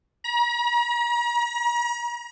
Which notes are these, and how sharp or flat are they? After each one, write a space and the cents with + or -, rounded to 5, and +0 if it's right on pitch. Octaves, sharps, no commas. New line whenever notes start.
A#5 +45